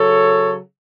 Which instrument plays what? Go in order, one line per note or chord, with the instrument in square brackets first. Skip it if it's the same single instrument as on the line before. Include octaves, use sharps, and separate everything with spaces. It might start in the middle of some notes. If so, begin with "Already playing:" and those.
Already playing: [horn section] C#3 F#3 A4 C#5